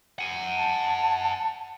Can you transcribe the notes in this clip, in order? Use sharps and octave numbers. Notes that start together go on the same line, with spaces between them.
F#5 G#5
A5